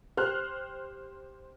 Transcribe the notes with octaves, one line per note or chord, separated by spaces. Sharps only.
G4 C5 F6 F#6